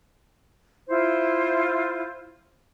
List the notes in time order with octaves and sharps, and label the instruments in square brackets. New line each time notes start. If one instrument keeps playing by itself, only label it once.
[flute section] E4 F4 C5